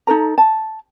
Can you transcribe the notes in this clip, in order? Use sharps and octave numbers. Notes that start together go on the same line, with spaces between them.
D#4 A4 A#4 A#5
A5